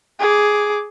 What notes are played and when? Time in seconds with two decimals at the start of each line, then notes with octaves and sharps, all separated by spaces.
0.20 G#4 D6